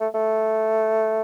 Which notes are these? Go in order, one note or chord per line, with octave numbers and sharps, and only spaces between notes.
A3
A3